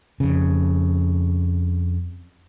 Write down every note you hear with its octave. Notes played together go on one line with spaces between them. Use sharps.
F2 C#3